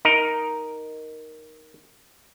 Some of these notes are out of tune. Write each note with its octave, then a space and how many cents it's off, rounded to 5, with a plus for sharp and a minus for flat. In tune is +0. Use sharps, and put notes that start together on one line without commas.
D#4 +0 A#4 +5